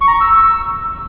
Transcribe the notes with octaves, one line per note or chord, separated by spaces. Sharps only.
C#6
A#5
C#6
E6